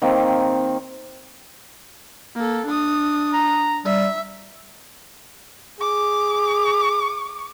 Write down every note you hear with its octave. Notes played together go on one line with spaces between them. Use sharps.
D#3 A#3 C4
A#3 A4
D4 D#6
A#5
G3 E5
G#4 D6